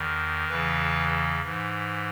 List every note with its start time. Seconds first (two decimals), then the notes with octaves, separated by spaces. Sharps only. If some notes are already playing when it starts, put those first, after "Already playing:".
Already playing: E2 D#3
0.48 E2 C#3 E3 B4
1.43 G#2 E3